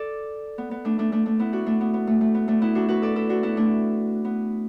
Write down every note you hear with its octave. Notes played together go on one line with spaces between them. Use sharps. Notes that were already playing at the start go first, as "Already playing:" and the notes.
Already playing: A4 D5
B3
B3
A3 D4
A3 D4
A3 D4
A3 D4
B3 E4
D4 F#4
A3 D4
B3
B3
A3
A3
B3
A3 D4
B3 E4
D4 F#4
F#4 B4
A4 D5
E4 A4
D4 F#4
B3 E4
A3 D4
B3